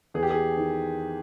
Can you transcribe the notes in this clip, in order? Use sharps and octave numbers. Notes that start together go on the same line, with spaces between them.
E2 G#4
G4
G#4
D#3